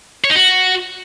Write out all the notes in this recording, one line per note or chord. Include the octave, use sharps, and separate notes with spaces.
C#5
D#4
F#4